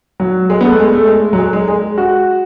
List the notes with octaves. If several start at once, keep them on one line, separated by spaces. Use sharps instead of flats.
F#3
G#3
B3
A3
G#3
A3
G#3
F#3
G#3
G#3
G#3
F#4